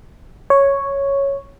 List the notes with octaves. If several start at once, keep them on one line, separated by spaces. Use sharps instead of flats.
C#5